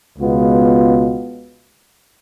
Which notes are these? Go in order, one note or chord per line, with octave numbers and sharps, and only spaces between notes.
C#2 B2 G#3 B3 F4